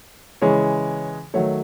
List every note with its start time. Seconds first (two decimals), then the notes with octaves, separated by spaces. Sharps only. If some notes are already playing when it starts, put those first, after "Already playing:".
0.42 C#3 E3 G#3 C#5
1.34 D#3 F#3 A3 C#5